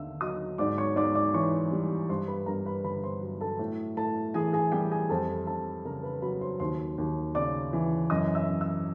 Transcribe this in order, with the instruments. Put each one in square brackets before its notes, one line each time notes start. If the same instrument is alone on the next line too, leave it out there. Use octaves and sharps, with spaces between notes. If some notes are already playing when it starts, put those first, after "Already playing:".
Already playing: [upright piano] D#2 D3 E5 F5 E6
F#3 D#5 D#6
G#2 D5 D6
C#5 C#6
G#2 D5 D6
D5 D6
E3 C#5 C#6
G3
G2 C5 C6
B4 B5
G2 A#4 A#5
B4 B5
D3 B4 B5
C5 C6
F#3
A4 A5
A2
A2 A4 A5
E3 G#4 G#5
G#4 G#5
G3 G4 G5
G#4 G#5
F2 A4 A5
F2 A4 A5
C#3 A#4 A#5
B4 B5
F#3 B4 B5
C5 C6
D#2 C5 C6
D#2
C#3 D5 D6
E3
F#2 D#5 D#6
E5 E6
F#2
E5 E6